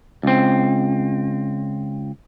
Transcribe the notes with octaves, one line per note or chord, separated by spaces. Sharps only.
C#2 C4